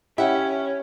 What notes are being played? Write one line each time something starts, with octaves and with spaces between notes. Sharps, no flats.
C#4 E4 G4 E5 F#5